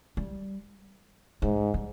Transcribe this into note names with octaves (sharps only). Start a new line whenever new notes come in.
G3
G#2 G#3
G3